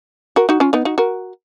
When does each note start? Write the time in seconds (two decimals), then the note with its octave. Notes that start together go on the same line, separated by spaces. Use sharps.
0.36 F#4 A#4
0.49 D#4 F#4
0.60 C#4 F4
0.73 B3 D#4
0.85 D#4 F#4
0.98 F#4 A#4